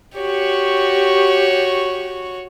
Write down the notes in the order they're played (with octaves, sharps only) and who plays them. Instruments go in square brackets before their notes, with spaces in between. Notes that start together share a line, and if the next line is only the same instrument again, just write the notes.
[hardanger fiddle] F#4 C#5 [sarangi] G4